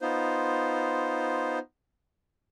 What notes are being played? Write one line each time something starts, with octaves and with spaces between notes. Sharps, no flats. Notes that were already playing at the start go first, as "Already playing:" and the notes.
B3 D#4 F4 C5